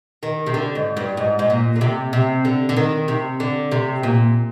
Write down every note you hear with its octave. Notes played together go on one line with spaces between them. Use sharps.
D#3
C3
D3
G#2
G2
G#2
G#2
A#2
D3
C3
C3
D3
D3
D#3
C3
D3
C3
A#2